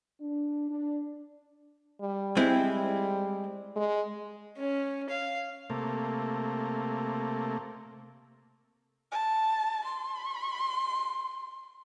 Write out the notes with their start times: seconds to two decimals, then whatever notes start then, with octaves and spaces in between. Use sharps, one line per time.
0.21 D4
0.71 D4
2.01 G3
2.37 G#3 C4 E4
3.76 G#3
4.57 C#4
5.09 F5
5.70 C3 A3 A#3
9.12 A5
9.85 C6